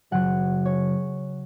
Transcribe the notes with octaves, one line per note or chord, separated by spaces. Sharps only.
F#1 F#2 C#3 F#3 F#5
C#5